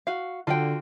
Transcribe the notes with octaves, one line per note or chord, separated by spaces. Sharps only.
F#4 F5
D3 F4 F#4 G5